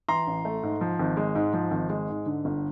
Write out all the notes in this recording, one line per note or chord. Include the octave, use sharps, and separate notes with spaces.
E3 A#5 C6
A1
A3
G#2
F3
G#1
G#3
G#2
F3
G#1
G#3
G#2
D3
G1